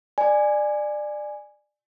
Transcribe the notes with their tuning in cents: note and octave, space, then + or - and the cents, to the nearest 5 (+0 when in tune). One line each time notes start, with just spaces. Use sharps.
D5 +20 G#5 +0